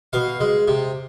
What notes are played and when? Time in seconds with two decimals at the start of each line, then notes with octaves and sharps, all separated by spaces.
0.13 B2 F5
0.40 G#3
0.68 C3